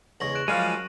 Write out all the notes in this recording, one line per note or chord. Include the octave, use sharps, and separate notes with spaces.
E2 C#3 G#3 C#6 A#6 F#7
F#6 D7 E7
F#2 F3 G3 G#3 F5 D#7